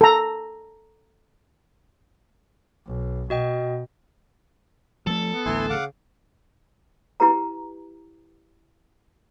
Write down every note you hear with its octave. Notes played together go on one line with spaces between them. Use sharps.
A4 A#5
B1
B2 F#4 D#5 G5
F3 G#3 A3 A4
B3
A1 D2 E4 G#5 C6
C#3 F5 F#5 D6
E4 G4 B4 A#5